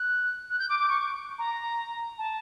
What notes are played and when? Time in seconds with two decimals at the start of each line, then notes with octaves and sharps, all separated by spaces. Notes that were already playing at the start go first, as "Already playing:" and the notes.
Already playing: F#6
0.50 F#6
0.59 G6
0.69 D6
0.79 D6
0.89 C#6
1.38 A#5
2.18 A5